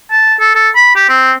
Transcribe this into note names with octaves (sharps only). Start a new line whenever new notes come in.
A5
A4
A4
B5
G4
C4